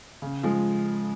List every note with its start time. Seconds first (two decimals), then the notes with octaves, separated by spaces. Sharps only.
0.22 C#3
0.43 F3 G#3